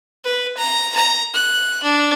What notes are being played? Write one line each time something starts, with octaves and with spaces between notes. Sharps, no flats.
B4
A#5
A#5
F#6
D4